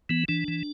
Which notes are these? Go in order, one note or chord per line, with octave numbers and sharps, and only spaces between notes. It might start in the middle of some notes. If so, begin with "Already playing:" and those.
E3 B3
E3 D4
E3